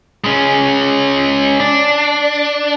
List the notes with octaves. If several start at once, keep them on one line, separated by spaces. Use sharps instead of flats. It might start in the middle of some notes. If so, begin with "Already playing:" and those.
G#3 C#4
D4